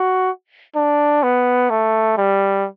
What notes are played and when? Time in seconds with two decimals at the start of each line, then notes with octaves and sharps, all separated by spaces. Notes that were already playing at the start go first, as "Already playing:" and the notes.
Already playing: F#4
0.75 D4
1.23 B3
1.70 A3
2.17 G3